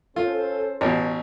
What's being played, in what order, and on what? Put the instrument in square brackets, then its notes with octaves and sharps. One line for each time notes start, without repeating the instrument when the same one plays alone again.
[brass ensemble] C#4 A4 C5 [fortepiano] F4
[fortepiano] A1 B2